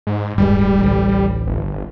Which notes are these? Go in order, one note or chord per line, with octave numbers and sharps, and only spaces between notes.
G#2
D1 G2 G3 G#3
A1 D2
G1